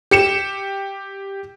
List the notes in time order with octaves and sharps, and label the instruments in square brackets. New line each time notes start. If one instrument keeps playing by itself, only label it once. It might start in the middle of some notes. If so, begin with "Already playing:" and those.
[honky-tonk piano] G4 C#7 E7